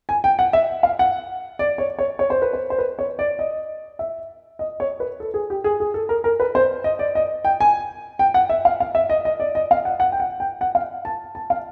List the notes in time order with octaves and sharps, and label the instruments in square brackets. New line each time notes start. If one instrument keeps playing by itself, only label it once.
[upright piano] G#5
G5
F#5
E5
F5
F#5
D5
C#5
C#5
C#5
C5
B4
C5
C5
B4
C#5
D5
D#5
E5
D#5
C#5
B4
A4
G#4
G4
G#4
G#4
A4
A#4
A#4
B4
C5
D#5
D5
D#5
G5
G#5
G5
F#5
E5
F5
F5
E5
D#5
D#5
D5
D#5
F5
F#5
F#5
G5
F#5
G5
F#5
F5
A5
A5
F5